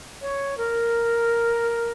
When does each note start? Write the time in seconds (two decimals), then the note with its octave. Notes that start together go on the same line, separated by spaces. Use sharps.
0.22 C#5
0.57 A#4